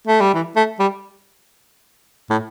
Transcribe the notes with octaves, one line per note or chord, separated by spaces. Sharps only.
A3
G3
E3
A3
G3
A2